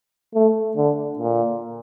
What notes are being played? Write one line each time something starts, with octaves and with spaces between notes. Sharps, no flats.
A3
D3
A#2